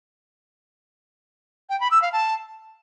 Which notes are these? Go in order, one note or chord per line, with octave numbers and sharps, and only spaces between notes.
G5
B5
E6
F5
A5